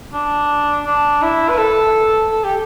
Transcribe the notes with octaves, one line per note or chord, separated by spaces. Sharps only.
D4
D4
E4
B4
A4
A4
G4